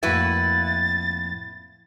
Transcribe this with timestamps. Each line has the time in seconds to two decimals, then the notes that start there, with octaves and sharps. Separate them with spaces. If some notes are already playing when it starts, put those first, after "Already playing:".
0.03 F2 A2 A#3 E4 F#4 B4 A6